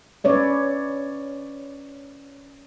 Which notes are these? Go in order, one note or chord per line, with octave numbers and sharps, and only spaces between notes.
C#4 B4 C#5 D5 E5